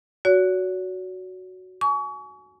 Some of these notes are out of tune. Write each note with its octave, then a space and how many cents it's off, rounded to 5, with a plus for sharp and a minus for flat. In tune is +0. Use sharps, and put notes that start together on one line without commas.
F#4 +0 C#5 +45
G#5 +25 C#6 +35